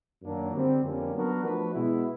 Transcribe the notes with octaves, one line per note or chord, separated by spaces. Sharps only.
F#2 D#3 F#3 A#3 D4
D3 G3 C4
F2 D3 G3 A#3 C#4
F#3 B3 D4 F#4 A#4
F3 A3 D4 F#4 B4
B2 G#3 B3 E4